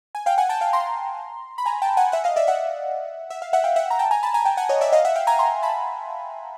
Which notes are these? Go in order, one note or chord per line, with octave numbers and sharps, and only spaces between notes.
G#5
F5 G5
F#5 G#5
G5 A5
F5 G5
A#5 C6
B5
G#5 A#5
G5 A5
F#5 G#5
E5 F#5
D#5 F5
D5 E5
E5 F#5
E5
F5
E5 F#5
F5 G5
E5 F#5
A#5
G5 A5
G#5 A#5
A5 B5
G#5 A#5
G5 A5
F#5 G#5
C#5 D#5
D5 E5
D#5 F5
E5 F#5
F5 G5
G#5 A#5
A#5 C6
A5 B5